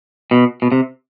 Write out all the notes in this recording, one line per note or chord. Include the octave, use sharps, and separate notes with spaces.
B2
B2
C3